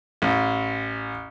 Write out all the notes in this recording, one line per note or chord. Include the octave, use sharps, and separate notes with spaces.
A1